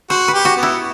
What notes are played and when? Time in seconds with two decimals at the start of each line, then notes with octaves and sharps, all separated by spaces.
0.10 F#4 C5
0.28 B4
0.34 G4
0.45 F#4
0.57 B3
0.63 E4